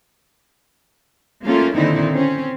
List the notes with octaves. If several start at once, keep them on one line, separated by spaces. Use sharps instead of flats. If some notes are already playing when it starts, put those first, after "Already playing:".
F#3 A3 A#3 C#4 F4
A#2 D3 D#3 C4 D#4 E4
C4 C#4